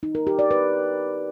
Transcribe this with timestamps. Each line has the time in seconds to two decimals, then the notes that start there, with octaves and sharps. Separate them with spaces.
0.03 D#4
0.15 A#4
0.27 G4
0.39 D5
0.51 B4